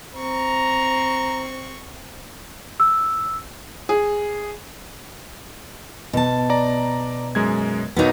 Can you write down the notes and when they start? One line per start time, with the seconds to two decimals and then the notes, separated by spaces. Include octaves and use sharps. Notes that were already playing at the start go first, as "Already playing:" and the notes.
0.14 C4 A#5 C#6
2.80 E6
3.89 G#4
6.13 B2 A5
6.50 D5 A#5
7.35 F#2 G#3 G#6
7.96 B1 F#3 B3 D#4 A#4